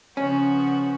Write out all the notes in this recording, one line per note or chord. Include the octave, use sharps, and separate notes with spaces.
C#3 F3 B3 C#4 F#4